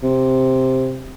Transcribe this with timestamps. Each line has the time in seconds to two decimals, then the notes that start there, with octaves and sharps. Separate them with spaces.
0.03 C3